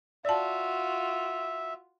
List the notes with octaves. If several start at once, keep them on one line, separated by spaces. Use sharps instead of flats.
F4 F#4 D5 E5 A5